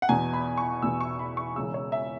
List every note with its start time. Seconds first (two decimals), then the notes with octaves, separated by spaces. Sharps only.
0.02 F#5
0.09 E2 B2 B3 G#5
0.33 B5
0.58 C#6
0.82 E2 B2 B3 E6
1.01 C#6
1.19 B5
1.37 C#6
1.56 E1 E2 C#3 E6
1.74 C#5
1.92 E5